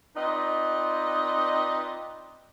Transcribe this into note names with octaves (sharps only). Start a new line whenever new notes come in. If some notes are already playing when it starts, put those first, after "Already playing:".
C4 D#4 F4 B4 D5 D#5